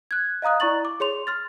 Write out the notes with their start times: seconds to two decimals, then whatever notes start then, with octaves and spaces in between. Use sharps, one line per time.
0.11 F#6 G#6
0.42 D#5 F5 A#5 D#6 F#6
0.60 E4 D5 A#5 C#6 A6 F#7
0.85 D6
1.00 G#4 C#5 C6 F7
1.27 C6 F6 A6